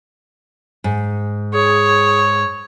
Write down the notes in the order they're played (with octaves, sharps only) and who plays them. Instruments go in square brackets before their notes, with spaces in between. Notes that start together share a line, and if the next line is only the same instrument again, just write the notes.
[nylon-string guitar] G#2
[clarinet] G#4 [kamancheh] C#5